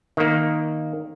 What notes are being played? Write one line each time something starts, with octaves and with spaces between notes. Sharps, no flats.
D#3 A#3